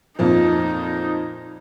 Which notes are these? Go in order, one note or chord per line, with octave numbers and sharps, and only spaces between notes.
F2 A#2 F3 D#4